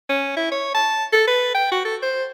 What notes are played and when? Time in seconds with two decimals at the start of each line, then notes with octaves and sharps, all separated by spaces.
0.09 C#4
0.36 E4
0.51 C#5
0.74 A5
1.13 A4
1.27 B4
1.54 G5
1.71 F#4
1.85 A4
2.02 C5